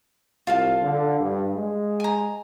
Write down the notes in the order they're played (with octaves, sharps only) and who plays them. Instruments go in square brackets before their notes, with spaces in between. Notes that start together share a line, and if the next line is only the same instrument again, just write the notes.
[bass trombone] C2 [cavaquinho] F4 F5 A5
[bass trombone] D3
G2
G#3
[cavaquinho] G#5 A#5